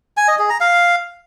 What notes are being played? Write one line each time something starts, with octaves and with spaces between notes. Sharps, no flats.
G#5
D#5
G#4
A#5
F5